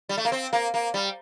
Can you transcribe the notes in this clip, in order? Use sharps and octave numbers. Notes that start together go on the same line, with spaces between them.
G3
A3
A#3
C4
A#3
A#3
G3